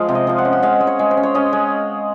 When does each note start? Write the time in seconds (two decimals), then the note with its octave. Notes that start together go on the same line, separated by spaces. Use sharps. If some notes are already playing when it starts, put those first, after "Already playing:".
Already playing: F3 G#3 F5
0.09 C3
0.15 D#5
0.27 F3 F5
0.38 F#5
0.45 C#4
0.53 F#5
0.63 G#3 F5
0.80 G#3
0.87 C#5
0.99 G#3
1.11 C5
1.17 C#4
1.23 C#5
1.35 C#4 D#5
1.53 G#3